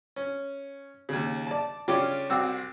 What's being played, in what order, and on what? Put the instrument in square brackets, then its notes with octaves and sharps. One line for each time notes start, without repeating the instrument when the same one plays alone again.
[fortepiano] C#4
D#2 C#3
D5 A5
C#3 C#4 D4 F4 G4 D6
C2 C4 F#4 D6 E6